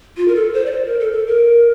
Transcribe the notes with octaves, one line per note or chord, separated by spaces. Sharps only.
F4
A#4
A4
C5
D5
C5
A#4
A4
A4
A#4